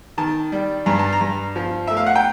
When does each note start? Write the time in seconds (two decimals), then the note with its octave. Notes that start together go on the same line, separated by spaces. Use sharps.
0.18 D#3 A5
0.52 G3
0.86 G2 A#5
0.99 A5
1.13 A#5
1.21 G2
1.56 F3
1.87 A3 E5
1.97 F5
2.07 F#5
2.16 G5